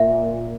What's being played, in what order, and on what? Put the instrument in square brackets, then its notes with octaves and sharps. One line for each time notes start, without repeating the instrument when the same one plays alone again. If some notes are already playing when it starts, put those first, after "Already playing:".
Already playing: [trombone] A#2 [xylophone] E5